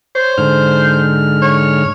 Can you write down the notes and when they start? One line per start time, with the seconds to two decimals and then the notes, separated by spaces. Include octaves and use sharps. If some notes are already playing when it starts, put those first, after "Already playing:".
0.15 C5 C#5
0.38 G#2 D3 F6
1.42 C#5